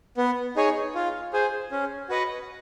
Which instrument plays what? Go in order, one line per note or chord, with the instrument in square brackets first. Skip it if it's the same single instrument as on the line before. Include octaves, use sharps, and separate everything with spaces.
[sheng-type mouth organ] B3
D#4 G#4 C#5
F4
G#4 C5
C#4
F#4 B4 D#5 F#5